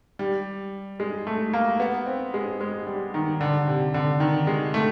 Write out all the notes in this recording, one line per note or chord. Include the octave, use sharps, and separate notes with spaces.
G3
G#3
A3
A#3
B3
C4
G#3
G#3
G3
D#3
D3
C3
D3
D#3
G#3
A3